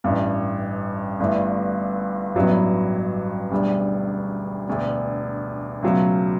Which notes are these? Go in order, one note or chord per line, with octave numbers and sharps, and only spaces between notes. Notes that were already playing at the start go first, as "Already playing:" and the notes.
A1 G2 E3
G1 G2 E3 A3
A1 G2 F#3 B3 E4
E1 D2 D3 G3
E1 D2 D3
C#2 B2 F#3 A3